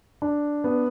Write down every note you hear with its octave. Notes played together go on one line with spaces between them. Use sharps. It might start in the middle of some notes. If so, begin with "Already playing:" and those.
D4
B3